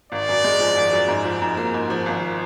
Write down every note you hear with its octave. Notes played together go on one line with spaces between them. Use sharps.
G#1 D5
F#2
G#3
F3
G#1
F#2
G#2
F3
G#2
A#3
G#2
F3
G#1